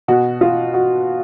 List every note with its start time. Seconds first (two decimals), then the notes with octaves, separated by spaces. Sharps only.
0.08 B2 F#4
0.41 F4
0.74 F#4